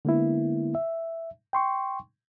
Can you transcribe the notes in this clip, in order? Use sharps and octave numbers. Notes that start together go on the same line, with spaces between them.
D3 G#3 A#3 B3 E4
E5
G5 C6 C#6